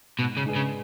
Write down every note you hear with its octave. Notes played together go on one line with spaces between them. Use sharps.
G#2 B2
C#3
G#3 D4 G#4 B4
C#3